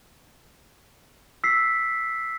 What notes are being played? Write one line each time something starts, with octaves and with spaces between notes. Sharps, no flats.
E6 B6 C7